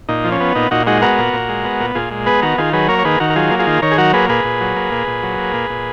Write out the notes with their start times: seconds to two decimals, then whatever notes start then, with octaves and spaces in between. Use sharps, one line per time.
0.09 A#2 D#4
0.24 F3
0.32 C#4
0.41 B3
0.55 A#2 D#4
0.71 A#2 D#4 F#4
0.87 G#3 D#4 F#4
1.02 B3 F#4 A#4
1.18 A#2
1.33 A#2
1.49 G#3
1.65 B3
1.80 A#2
1.95 A#2 F4 G#4
2.11 G#3
2.26 B3 G#4 B4
2.42 D#3 F#4 A#4
2.58 D#3 F4 G#4
2.73 F#3 G#4 B4
2.89 A#3 A#4 C#5
2.99 C#5
3.05 D#3 G#4 B4
3.20 D#3 F#4 A#4
3.30 A#4
3.36 F#3 F4 G#4
3.51 A#3
3.59 F4 G#4
3.67 D#3
3.82 D#3 A#4 C#5
3.92 G#4
3.98 F#3 F#4 A#4
4.13 A#3 G#4 B4
4.29 A#2 G#4 B4
4.44 A#2
4.61 F#3
4.76 A#3
4.92 A#2
5.07 A#2
5.23 F#3
5.38 A#3
5.54 A#2
5.70 A#2